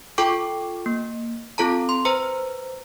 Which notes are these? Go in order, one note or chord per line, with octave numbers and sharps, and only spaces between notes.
F4 A4 G5 C#6 D6
A#3
C4 F4 A4 A5 A#5
C6
B4 C5 A#5